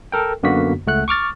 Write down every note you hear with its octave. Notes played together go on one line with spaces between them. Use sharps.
A4 A#4 G5
F#2 D3 A#3 B3 F#4 B6
C#2 A3 F#5 F#6
C#6 D6 F6 A6